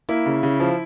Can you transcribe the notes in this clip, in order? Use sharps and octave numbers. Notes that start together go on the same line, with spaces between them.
A#3 E4
C#3
C#3
F3